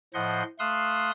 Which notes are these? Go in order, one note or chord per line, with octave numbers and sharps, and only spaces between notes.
A2 F3 C5 D#5 F#5 C6
A3 F5 C6 D#6 E6 F#6